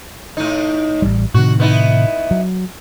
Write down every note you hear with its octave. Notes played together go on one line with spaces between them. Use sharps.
A2 D#4
A1 G3
A2 C3 D#3 F#4
B3 D#4 E4
F#3